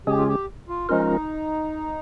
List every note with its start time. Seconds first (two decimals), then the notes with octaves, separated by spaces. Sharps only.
0.07 C#3 G#3 C#4 G4 G#4
0.17 F4
0.27 G4
0.69 F4
0.89 F3 G#3 C#4 D#4 F4 A#4